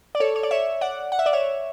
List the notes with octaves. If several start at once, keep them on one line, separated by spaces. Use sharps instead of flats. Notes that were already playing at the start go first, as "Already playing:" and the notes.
D5
A4 C#5
C#5
D5
C#5 E5
D5 F#5
F#5
E5
D5
C#5 E5